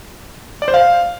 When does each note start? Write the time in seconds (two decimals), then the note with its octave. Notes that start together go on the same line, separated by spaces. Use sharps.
0.62 D5
0.68 C5
0.74 F5